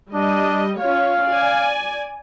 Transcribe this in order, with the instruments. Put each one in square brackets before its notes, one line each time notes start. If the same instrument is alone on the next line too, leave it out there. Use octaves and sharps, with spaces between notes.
[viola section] G3 D#5 [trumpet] D4
[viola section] C#4 F4 C#5 [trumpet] F5
[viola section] D5 G#5